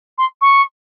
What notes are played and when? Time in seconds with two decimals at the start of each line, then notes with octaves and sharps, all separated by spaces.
0.18 C6
0.41 C#6